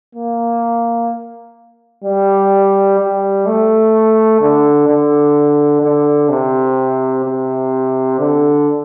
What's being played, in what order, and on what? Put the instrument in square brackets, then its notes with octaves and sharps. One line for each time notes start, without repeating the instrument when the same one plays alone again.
[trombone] A#3
G3
G3
A3
D3
D3
D3
C3
C3
D3